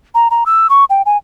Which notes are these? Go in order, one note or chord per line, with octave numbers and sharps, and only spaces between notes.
A#5
A#5
E6
C#6
G5
G#5